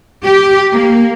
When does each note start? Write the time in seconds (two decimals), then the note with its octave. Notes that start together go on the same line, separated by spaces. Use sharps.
0.25 G4
0.72 A#3